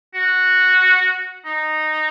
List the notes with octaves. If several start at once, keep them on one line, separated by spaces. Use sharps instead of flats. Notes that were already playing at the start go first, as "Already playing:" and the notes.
F#4
D#4